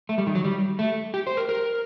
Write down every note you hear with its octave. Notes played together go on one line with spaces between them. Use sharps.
A3
G3
D#3
F#3
G3
A3
G4
C5
A#4
A#4